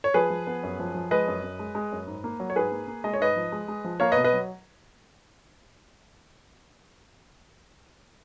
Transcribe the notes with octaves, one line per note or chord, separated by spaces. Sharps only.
C#5
F3 G#4 B4
F3
B3
F#2
F3
F3
G#3 B4 D#5
F#2
F#2
G#3
G#3
F#2
G#2
A#3
F#3
C#5
G#2 G#4 B4
A#3
A#3
G#3 D#5
C#5
G#2 B4 D#5
F3
G#3
G#3
F3
A#3 C#5 F5
B4 D#5
B2
B4 D#5
F#3